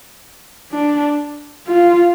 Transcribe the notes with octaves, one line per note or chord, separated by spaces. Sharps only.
D4
F4